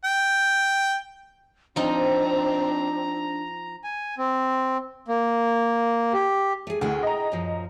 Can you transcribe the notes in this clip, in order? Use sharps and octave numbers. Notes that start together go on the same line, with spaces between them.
G5
F3 C4 D4 D#4 A#5
G#5
C4
A#3
G4
A3 G#4
D2 E4 G#4 G5
D#5 A#5
F#2 A#2 F3